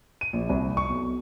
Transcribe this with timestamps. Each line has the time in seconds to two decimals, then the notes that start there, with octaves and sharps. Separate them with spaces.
0.21 D#7
0.33 A#1
0.49 C2
0.77 C#6
0.90 B1